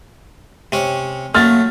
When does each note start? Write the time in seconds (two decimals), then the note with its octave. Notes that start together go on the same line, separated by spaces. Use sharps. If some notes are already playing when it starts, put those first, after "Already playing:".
0.72 C3 C#4
1.35 F#3 A3 A#3 F6 A6